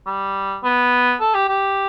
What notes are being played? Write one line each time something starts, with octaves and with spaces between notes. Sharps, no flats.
G3
B3
A4
G4
G4